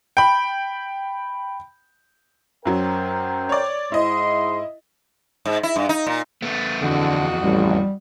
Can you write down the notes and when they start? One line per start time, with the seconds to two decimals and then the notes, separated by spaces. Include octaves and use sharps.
0.17 G5 B5
2.65 F#2 F#3 A#4 C5 G5
3.49 C#5 D5
3.92 G#2 E4 D#5 C6
5.45 G#2
5.63 E4
5.76 G2
5.89 D#4
6.07 A#2
6.42 A3 B3
6.81 F2 D3 E3 F#4 D#5
7.41 A1 G3